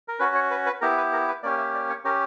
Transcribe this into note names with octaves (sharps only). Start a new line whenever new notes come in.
A#4
C#4 F#4 B4
C#5
B4
B4
B3 E4 G4 A#4
B4
A#4
B4
A#3 C#4 G4 D5
E5
D5
C#5
C#4 G4 A#4